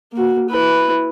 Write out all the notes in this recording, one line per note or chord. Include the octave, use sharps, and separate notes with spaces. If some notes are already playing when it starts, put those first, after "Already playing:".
A#3 F#4
E4 B4